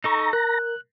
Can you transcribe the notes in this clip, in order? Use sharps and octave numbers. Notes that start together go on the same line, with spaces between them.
D#4 A4 A#5 C#6
A#4 F#6